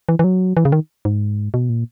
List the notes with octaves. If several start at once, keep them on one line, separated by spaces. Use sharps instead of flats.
E3
E3
F#3
E3
C#3
D#3
G#2
B2
A#2